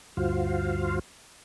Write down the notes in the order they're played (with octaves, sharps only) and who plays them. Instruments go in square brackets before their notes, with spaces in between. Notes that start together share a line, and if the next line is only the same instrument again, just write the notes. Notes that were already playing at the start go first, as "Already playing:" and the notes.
[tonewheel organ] D2 G2 F4 F#4 C5 F5